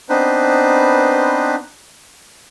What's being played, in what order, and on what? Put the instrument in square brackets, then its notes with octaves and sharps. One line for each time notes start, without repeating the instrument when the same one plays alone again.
[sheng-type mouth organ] B3 C4 D4 D#4 B4 C5